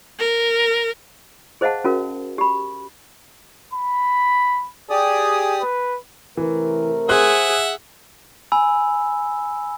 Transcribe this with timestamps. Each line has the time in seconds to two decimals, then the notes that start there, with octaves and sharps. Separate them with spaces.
0.19 A#4
1.61 G#4 C5 D#5 F5 F#5 A5
1.84 C#4 F#4 A#4
2.38 G4 B5
3.74 B5
4.90 G4 G#4 D5 D#6
5.61 B4
6.37 C3 E3 A3 A#4
7.09 G#4 C5 E5 F#5 F#6
8.52 G#5 B5 E6